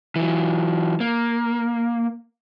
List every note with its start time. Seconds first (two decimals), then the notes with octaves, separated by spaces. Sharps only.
0.16 E3 F#3
1.00 A#3